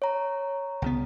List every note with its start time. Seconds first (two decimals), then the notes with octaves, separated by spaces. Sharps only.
0.02 C#5 A#5
0.82 C2 C#3 B3